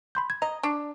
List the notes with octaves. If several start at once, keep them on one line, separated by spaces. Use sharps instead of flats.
B5 C6 G6
G#6
D#5 A#5
D4 C#6